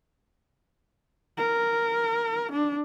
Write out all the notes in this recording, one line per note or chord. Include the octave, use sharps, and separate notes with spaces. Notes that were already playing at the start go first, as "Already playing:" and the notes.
A#4
D4